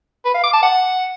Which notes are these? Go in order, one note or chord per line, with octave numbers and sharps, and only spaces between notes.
B4
F5
D6
A5
F#5